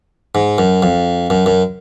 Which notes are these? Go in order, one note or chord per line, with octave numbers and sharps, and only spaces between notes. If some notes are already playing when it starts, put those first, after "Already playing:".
G#2
F#2
F2
F#2
F#2